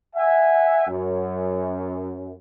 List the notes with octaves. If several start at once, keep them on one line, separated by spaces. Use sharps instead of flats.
E5 F#5 G#5
F#2